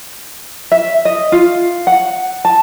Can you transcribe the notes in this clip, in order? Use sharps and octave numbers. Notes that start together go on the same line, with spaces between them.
E5
D#5
F4
F#5
A5